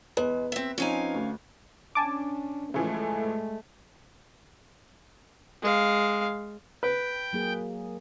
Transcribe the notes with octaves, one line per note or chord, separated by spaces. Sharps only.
E2 G#3 B4
C4 E5
F3 C4 C#4 D#4 F5 G#5
D2
C#4 D4 G#5 A5 D6
A2 C#3 E3 F3 G#3 A3
G#3 F5
B4 G5
F#3 A#3 G#4